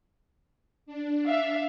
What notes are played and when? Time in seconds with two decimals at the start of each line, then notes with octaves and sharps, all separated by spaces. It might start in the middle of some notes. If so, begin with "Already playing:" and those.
0.86 D4
1.26 E5 F5